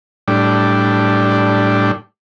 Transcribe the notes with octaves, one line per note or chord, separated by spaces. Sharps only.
A2 G3 D4